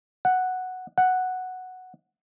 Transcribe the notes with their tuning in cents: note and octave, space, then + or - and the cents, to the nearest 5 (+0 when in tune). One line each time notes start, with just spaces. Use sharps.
F#5 +0
F#5 +0